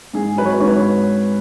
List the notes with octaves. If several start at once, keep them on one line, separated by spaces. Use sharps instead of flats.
G#2 G#4
F#3 B4
C#5
B4
G#2 C#5
B4
C#5